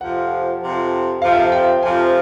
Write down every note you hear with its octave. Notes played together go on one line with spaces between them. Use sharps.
F2 C3 F3 F#5
F2 C3 F3
F2 C3 F3 F5
E5
F5
G5
F2 C3 F3 G#5